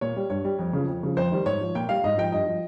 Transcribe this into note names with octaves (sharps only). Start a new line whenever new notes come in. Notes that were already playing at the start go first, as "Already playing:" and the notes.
A#2 C#5
G3
G2 C#5
G3
F2
C#3 F3
F2
C#3 F3
F2 C5
D#3 G3
G#2 C#5
F3
A#2 G5
G3 F5
G#2 D#5
F3 G5
G2 D#5
F3